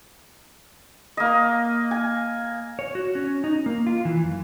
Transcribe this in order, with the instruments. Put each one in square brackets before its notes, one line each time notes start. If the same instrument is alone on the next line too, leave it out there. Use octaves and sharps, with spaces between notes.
[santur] A#3 D#5
G#5
[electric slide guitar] C#5
F#4
C#4
D#4
A#3
F4
E3
F#2